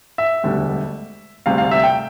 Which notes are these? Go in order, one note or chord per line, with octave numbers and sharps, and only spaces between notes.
E5
E1 D2 D3 G3
D2 C3 G3 F5
F5
E5
G5